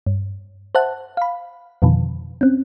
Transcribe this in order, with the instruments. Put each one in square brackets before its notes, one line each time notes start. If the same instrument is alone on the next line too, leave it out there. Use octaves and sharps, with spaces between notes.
[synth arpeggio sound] G2
C5 E5 F#5 A5 F#6
F5 B5
F2 B2 D3 D#3 F3
C4 C#4